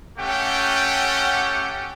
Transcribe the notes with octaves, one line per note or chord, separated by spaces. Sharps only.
A3 C#4 G4 F#5 G5